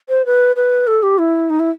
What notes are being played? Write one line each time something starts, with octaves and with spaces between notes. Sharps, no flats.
C5
B4
B4
A4
G4
E4
D#4
E4